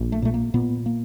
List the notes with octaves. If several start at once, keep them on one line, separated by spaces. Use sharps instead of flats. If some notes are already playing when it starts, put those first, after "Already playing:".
Already playing: A#1
A3
A#2 A3
A#3
A#2 B3
A#3